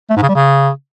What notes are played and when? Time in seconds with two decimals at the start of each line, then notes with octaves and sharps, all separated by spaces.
0.10 A3
0.16 G#2
0.23 C#3
0.29 G3
0.35 C#3